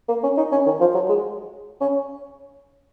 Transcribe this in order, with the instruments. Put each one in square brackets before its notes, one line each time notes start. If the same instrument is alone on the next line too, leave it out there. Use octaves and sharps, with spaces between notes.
[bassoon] A#3
C#4
D#4
C#4
D#3
F3
F#3
G#3
C#4